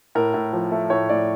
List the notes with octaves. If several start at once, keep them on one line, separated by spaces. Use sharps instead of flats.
A2 A#4
A2
F3
A3
A2 C#5
A2 D5